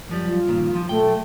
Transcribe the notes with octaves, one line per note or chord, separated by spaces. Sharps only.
F#2 F3 G3
F4
G2 A#2 D#3
F3
B1 A3 G5